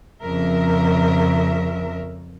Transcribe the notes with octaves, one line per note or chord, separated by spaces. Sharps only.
F2 C#3 A#4 E5